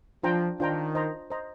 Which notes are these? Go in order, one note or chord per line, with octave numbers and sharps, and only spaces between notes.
F3 D4 F4 C5 G5 A#5
D#3 D4 F4 C5 G5 A#5
C5 D#5 A#5
C5 D#5 A#5